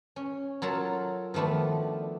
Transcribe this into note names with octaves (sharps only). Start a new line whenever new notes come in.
C#4
F#3 F4 A4 A#4 A#5
D#3 F3 A3 B3 D4